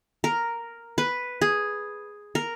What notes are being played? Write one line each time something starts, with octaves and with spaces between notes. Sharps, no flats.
A#4
B4
G#4
A#4